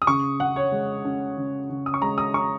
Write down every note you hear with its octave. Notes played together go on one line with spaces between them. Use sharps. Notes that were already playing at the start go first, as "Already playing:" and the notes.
D#6
C#3 C#6
C#3 F#5
C#5
G#3
C#4
C#3
C#3
D#6
C#6
G#3 A#5
D#6
C#4 C#6